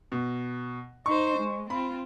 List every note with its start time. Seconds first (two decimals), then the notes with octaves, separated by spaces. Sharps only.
0.12 B2
1.06 D#4 C5 C#6
1.38 G#3
1.70 C4 F4 B5